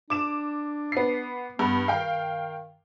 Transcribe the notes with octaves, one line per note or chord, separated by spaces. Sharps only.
D4 D6 E7
B3 C7
G2 B3
D#3 F5 G5